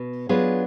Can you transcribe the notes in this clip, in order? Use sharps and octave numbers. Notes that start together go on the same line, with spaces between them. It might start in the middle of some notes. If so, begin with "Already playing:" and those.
Already playing: B2
F#3 B3 D4 F4 G#4